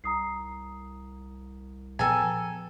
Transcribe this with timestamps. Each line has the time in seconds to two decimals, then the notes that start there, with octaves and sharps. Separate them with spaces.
0.04 C2 A#5 D#6 C7
1.99 A#2 F3 B3 A4 B4 G5 G#5 A#5